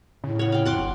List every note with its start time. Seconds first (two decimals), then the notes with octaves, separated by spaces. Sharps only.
0.24 A2 C#3
0.39 C#5 F#5
0.52 F5 G5
0.65 F2 F#5 C6 D6
0.80 G1